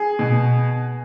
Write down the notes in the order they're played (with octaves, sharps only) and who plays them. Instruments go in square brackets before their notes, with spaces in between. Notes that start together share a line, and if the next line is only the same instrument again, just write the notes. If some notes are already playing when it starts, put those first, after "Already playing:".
Already playing: [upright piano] G#4
B2